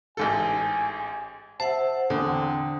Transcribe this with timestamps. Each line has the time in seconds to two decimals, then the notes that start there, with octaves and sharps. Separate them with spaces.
0.17 A1 G#2 A4 G#5
1.60 C5 E5 F#5 A5
2.10 E2 D3 C4 D#6